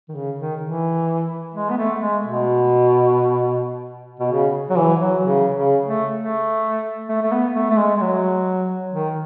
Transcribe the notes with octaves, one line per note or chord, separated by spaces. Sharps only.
D#3
C#3
D#3
E3
G#3
B3
A3
G#3
B2
B2
C#3
F#3
E3
F#3
C#3
C#3
A3
A3
A3
A3
B3
A3
A3
G#3
G#3
F#3
D#3